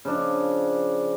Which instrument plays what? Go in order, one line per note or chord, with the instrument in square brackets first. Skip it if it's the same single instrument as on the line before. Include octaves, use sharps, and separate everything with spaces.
[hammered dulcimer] C#3 F3 D4